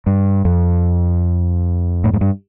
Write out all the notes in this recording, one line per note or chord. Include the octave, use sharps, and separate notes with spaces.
G2
F2
A2
G#2
G2